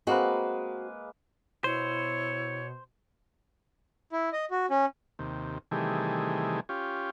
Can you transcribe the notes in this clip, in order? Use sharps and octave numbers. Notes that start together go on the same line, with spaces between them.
G#3 A#3 C4 F#4 B4
B2 E4 C5 C#5
E4
D#5
F#4
C#4
D#2 C3
C3 D#3 E3 G3 A3 G#4
C#4 F4 G4